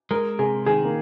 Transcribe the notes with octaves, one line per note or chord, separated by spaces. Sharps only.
G#3 A#4
C3 G#4
D#3 G#4
A#3